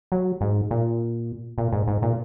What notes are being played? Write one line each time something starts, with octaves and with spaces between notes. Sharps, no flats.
F#3
G#2
A#2
A#2
G#2
G#2
A#2